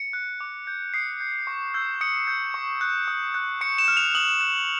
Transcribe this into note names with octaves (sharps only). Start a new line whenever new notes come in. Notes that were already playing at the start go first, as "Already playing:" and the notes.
Already playing: C#7
F#6
D6
G6
D#6 C7
G6
C#6
E6 G6
D#6 C#7
G6
C#6
F#6
D#6
F#6
C#6 C#7
E7
F6
F7
D#6 F#7
F#6